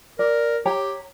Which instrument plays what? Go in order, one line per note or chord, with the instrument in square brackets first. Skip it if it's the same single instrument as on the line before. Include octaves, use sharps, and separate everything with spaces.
[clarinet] A#4 [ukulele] D5
[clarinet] G4 [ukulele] C#5 G5 A#5